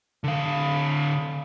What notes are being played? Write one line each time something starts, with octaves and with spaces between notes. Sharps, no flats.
D3 F5